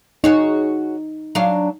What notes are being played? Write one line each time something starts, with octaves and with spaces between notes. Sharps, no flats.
D#4 F#4 G#4 C#5
F#3 D4 F5